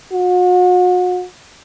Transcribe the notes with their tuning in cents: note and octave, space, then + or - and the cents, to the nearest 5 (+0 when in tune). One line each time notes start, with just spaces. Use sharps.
F#4 -40